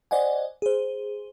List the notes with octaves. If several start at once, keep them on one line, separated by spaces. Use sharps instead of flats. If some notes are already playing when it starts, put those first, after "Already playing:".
C5 D5 D#5 F#5 G#5
G#4 C5